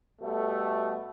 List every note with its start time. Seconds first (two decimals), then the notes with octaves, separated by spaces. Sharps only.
0.21 B2 G3 A3